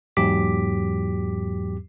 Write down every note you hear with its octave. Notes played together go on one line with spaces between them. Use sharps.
E2 G#2 F#3 G4 D6 B6